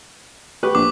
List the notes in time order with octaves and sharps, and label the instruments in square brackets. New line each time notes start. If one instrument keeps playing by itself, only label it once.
[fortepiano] G4 B4 C#6
[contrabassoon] A#1 [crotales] D6